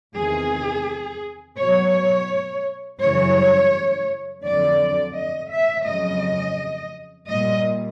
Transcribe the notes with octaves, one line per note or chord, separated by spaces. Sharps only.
E2 C3 D#3 G#4
B2 F#3 C#5
F#2 C#3 E3 G3 C#5
F2 D3 F#3 D5
D#5
E5
F2 C#3 F#3 D#5
A#2 G3 D#5